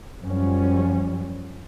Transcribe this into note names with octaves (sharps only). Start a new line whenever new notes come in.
F#2 F3 G3 C#4